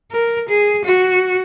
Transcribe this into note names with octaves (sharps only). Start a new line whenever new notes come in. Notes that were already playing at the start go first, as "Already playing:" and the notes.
A#4
G#4
F#4